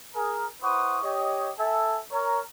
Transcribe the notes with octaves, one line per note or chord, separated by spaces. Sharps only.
G#4 A#4
E4 B4 C5 F#5 C#6 D#6
G4 C#5 D#5
A4 E5 G#5
A#4 C#5 A#5